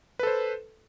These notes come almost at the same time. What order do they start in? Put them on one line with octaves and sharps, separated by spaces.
B4 A4 C5